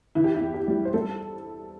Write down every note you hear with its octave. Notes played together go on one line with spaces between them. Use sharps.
E3 E4
G4
E4
E2
G4
G3
C5
G3 A4